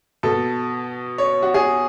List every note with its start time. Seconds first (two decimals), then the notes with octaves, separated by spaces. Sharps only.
0.23 B2 A4
1.18 C#5
1.43 F#4
1.54 G#4